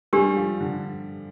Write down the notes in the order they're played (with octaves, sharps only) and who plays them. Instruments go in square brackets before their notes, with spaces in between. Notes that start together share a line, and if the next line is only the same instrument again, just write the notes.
[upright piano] G3 [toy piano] D4 G4 A#4
[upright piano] F3
D3